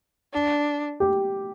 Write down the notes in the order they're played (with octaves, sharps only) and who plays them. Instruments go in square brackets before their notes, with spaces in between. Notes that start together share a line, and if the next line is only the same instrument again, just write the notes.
[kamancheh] D4
[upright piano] G4